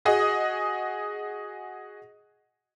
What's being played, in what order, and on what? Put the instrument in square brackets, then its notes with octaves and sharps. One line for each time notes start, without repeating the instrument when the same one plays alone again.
[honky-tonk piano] F#4 G#4 D#5